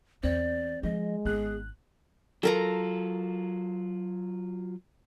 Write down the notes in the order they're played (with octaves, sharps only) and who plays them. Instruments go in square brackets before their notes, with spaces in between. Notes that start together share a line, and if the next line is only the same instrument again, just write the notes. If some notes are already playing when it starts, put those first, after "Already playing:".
[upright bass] E2 [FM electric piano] C4 [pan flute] D5
[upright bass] F3 [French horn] G#3 [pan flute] D#5
[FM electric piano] G#1 F#6 [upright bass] B3 [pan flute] G#4
[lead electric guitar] F#3 F4 [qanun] A4 A#4 A#5